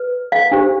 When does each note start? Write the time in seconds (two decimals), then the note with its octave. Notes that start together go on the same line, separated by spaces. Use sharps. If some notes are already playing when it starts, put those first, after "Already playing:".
Already playing: B4
0.32 F5
0.51 D4 G4 C5